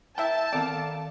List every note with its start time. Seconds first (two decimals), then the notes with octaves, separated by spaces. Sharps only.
0.18 A#3 E4 E5 G5 A5
0.53 D#3 B3 C4 A4 D5 F5